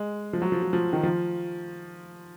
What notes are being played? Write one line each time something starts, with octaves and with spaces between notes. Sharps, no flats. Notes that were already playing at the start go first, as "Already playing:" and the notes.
Already playing: G#3
F3
F#3
F3
F3
F3
D#3
F3